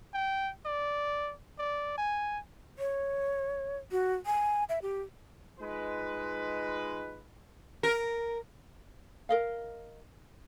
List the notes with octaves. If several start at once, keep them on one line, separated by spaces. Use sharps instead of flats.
G5
D5
D5
G#5
C#5
F#4
G#5
E5
G4
G#3 D#4 F4 B4
A#4
A#4 D#5 F5